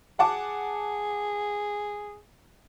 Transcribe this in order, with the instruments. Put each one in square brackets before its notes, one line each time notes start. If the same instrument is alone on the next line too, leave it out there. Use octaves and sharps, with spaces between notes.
[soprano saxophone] G#4 [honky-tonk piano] F#5 A5 D6